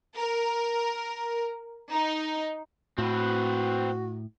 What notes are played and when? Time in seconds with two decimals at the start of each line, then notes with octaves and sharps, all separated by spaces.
0.16 A#4
1.92 D#4
2.99 A2 C4 F#4 B4